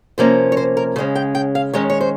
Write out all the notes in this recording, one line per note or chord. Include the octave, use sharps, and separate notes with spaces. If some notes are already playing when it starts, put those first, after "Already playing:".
C3 F3 A#3 C#4 C5
C#5
C5
A#4
C#3 G#3 C#4 C5
G5
G5
F5
D#3 G#3 C#4 C#5
C#5
C5